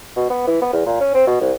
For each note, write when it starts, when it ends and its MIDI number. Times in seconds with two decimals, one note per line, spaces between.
0.16 0.27 47
0.30 0.45 59
0.47 0.59 52
0.62 0.71 59
0.73 0.85 40
0.86 0.98 46
1.00 1.10 61
1.14 1.25 60
1.27 1.38 47
1.40 1.52 36